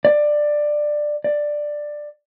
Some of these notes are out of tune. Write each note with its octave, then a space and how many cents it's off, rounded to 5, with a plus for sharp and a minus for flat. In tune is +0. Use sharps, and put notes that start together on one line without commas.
D5 +15
D5 +10